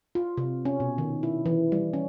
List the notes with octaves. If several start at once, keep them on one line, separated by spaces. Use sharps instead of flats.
F4
C3
C#4
B2
D#3
E4
E3
G3
C#4